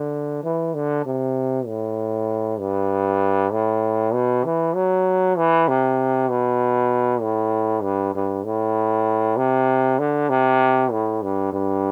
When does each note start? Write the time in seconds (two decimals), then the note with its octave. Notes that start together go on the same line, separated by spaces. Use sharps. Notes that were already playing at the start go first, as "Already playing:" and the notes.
Already playing: D3
0.44 E3
0.75 D3
1.06 C3
1.67 A2
2.60 G2
3.52 A2
4.14 B2
4.45 E3
4.75 F#3
5.37 E3
5.68 C3
6.30 B2
7.22 A2
7.83 G2
8.15 G2
8.45 A2
9.37 C3
9.99 D3
10.29 C3
10.92 A2
11.23 G2
11.53 G2